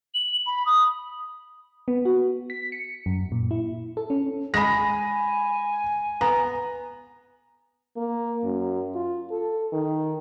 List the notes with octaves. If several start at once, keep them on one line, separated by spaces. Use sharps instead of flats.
F#7
B5
D#6
B3
F#4
B6
C#7
F#2
A#2
E4
A4
C#4
G#3 G#5 B5 A#6
B3 A#5
A#3
F#2
F4
A4
D#3